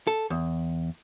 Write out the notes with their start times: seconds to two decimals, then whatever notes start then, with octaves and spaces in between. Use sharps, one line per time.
0.07 A4
0.30 E2